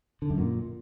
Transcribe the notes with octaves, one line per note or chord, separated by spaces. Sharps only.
D3
F#2
A#2